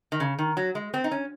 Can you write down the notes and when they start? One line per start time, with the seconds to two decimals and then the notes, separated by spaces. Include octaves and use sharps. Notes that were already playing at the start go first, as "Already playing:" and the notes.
0.12 D#3
0.20 C#3
0.39 D#3
0.57 F#3
0.75 G#3
0.94 C4
1.04 D#4
1.11 C#4